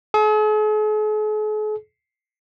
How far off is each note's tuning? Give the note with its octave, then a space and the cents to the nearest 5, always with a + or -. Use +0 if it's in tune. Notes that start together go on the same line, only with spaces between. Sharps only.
G#4 +45